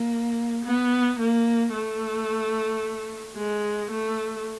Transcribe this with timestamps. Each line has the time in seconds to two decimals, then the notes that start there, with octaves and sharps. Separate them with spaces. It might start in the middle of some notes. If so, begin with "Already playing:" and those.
Already playing: A#3
0.65 B3
1.19 A#3
1.73 A3
3.36 G#3
3.91 A3